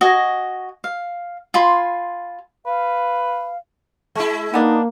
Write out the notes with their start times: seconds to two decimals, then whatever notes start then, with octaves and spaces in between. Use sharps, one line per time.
0.01 F#4 D#5 G#5
0.84 F5
1.54 F4 G#5 B5 C6
2.66 B4 F5
4.15 G#3 E4
4.54 A#3 B3 D4 D#4